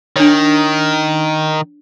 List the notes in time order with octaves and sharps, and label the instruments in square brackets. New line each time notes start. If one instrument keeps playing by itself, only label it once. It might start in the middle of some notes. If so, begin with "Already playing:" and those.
[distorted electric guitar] D#3 [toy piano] D4 C#5